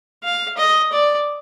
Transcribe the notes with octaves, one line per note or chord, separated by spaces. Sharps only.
F5
D#5
D5